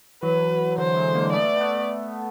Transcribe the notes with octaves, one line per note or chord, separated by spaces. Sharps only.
E3 F#3 B4
D3 E3 C5
F#3 G#3
G#3 A#3
A#3
A3 B3 D5
A3 B3